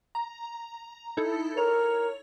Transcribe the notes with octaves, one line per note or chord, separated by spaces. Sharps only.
A#5
D#4 E4 A4
A#4 C#5 F7